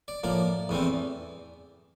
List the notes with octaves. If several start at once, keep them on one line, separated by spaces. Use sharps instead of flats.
D5
A2 F3 A#3 D5
E2 E3 A3 C4